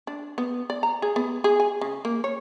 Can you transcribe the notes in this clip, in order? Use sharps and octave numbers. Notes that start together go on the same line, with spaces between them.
D4
B3
D5
A#5
G#4
B3
G#4
G#5
C#3
A#3
C#5